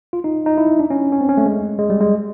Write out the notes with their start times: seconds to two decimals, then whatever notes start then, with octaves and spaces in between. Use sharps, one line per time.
0.13 F4
0.24 D#4
0.46 D#4
0.58 E4
0.80 D4
0.90 C#4
1.13 C#4
1.21 C4
1.29 C#4
1.37 A3
1.46 G#3
1.79 G#3
1.90 G3
2.01 G#3